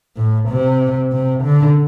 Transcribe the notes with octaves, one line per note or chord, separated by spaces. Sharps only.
A2
C3
C3
D3